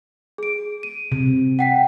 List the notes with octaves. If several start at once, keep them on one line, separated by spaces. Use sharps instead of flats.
G#4 D7
D#7
C3
F#5 G5 B6